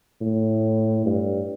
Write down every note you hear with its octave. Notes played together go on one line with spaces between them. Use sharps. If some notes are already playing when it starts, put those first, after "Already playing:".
A2
G2